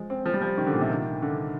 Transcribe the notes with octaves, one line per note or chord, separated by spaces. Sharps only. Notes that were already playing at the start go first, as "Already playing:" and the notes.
Already playing: F3 G#3
C4
F3
G3
F3
D#3
D3
A#2
C3
D#3
D3